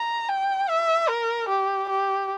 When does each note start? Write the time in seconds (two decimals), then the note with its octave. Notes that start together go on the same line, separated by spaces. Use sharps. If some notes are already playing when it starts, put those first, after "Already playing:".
Already playing: A#5
0.29 G5
0.69 E5
1.08 A#4
1.49 G4
1.89 G4